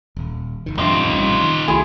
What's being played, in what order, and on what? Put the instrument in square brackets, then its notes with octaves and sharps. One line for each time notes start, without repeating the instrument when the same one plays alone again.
[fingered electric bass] D#1
F1 D#3
[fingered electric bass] F2 G#2 D4 [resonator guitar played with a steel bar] C3 F3 [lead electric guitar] D#4 F4
[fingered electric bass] A1 G3
D#3
[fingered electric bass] C2 F#3 A3 [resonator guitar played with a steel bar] E4 G#4 G#5